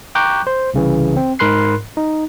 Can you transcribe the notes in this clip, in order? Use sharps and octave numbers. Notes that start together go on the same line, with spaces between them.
G5 A#5 C#6 D6 F#6 G6
C5
C2 C#3 E3
C4
G#2 A#4 B5 C6 F#6 C7
D#4